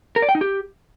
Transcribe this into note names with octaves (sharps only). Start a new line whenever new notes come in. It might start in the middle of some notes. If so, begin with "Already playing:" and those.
A#4
D5
G5
D#4
G4